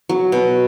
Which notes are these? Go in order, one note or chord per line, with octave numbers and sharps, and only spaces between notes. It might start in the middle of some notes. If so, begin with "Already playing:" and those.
F#3
B2